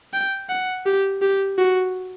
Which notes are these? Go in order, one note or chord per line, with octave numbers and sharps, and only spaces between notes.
G5
F#5
G4
G4
F#4